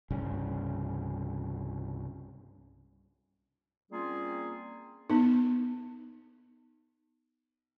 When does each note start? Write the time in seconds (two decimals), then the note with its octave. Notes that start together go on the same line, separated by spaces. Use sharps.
0.11 C2 G2 C#3
3.91 G3 A#3 C4 C#4 F4 G#4
5.10 B3 D#4